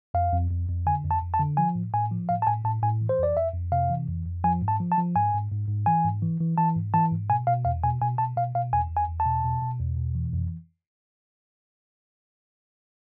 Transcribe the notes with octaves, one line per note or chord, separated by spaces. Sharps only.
F2 F5
F2
F2
F2
D3 G#5
F2
A5
F2
A5
D3
F3 G#5
A2
A2 G#5
F3
A2 F5
A5
A2 G#5
A2 A5
A2 G#5
E3
C5
F2 D5
F2 E5
F2
C3 F5
E3
F2
F2
F3 G#5
G#2
A5
F3
A5
F3
G#2 G#5
G#2
G#2
G#2
E3 G#5
G#2
E3
E3
E3 A5
G#2
E3 A5
G#2
B2 G#5
B2 F5
E2 F5
B2 G#5
B2 G#5
B2 A5
B2 F5
B2 F5
E2 G#5
E2
G#5
E2
A5
B2
B2
B2
E2
B2
E3
F2